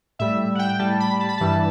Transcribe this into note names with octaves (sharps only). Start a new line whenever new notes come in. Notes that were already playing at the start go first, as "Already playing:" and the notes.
A2 G3 E5
F#5
G5
A2 G3 A5
B5
A5
B5
G2 E3 G3 A5